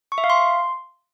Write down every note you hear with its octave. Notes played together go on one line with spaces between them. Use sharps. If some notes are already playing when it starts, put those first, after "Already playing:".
C#6
E5
F5
C6